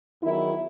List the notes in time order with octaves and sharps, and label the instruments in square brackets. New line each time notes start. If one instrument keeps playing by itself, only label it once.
[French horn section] E2 D#3 F#3 E4